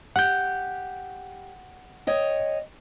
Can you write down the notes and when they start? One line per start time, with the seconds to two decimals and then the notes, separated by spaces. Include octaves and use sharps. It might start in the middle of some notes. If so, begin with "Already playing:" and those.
0.16 G4 F#5 G6
2.07 C#5 D#5 G5